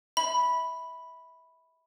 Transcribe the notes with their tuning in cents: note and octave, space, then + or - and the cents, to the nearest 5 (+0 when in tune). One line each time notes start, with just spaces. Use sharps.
E5 -25 B5 +0